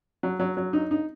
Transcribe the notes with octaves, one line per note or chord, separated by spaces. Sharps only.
F#3
F#3
F#3
D#4
D#4